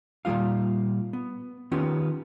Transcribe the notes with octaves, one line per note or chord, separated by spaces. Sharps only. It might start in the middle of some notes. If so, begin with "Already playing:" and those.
A#2 F3 G3 F4 F5
B3
D#3 B3 C#4 F4 G4